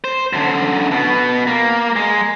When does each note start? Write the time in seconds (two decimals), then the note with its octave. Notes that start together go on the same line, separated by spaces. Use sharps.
0.04 C5
0.33 F#2 D3
0.91 B2 B3
1.47 A#3
1.96 G#3